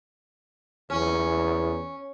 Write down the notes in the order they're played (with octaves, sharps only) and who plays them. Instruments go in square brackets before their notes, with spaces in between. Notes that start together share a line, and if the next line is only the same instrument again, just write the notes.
[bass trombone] E2 [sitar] C#4